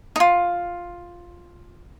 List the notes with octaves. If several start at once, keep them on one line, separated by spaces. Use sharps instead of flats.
D#4 F4